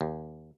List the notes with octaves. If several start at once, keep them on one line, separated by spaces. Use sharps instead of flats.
D#2